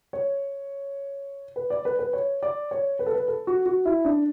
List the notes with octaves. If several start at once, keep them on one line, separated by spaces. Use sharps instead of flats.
C#5
B4
D5
B4
B4
C#5
D5
C#5
B4
A4
B4
A4
F#4
F#4
E4
D4